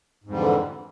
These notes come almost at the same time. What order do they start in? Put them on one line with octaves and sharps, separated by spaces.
G#2 F2 G3 D3 E3